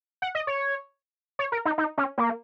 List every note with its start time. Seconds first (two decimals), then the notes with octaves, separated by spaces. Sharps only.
0.22 F#5
0.35 D#5
0.47 C#5
1.39 C#5
1.52 A#4
1.65 D#4
1.78 D#4
1.98 C#4
2.18 A#3